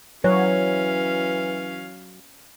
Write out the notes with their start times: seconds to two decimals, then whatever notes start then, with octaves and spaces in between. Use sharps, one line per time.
0.24 E3 F#3 C#4 C#5 F5